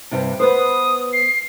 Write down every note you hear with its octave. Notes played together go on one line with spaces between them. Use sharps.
G2 C3
B3 B4 C5 D#6
C7